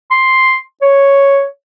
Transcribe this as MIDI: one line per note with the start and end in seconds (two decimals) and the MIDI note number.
0.11 0.58 84
0.82 1.45 73